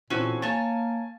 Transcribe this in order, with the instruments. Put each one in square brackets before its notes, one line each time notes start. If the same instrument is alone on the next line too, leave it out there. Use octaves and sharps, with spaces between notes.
[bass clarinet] A#2 [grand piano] E3 C4 A4 [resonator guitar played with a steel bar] C#4 F#4
[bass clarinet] A#3 [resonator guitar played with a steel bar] C#5 A5 [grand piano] G#5 A6